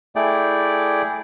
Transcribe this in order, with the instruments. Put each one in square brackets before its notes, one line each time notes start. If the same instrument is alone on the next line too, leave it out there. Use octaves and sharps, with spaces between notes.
[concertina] A3 E4 G#4 D5 G5